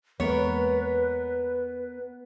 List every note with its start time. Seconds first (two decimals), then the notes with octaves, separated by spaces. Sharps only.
0.20 E2 G#3 A#3 B3 A#4 B4 C#5